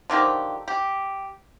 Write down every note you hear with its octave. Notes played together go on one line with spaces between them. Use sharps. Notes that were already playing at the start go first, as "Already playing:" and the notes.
D3 D#3 F3 G4
G4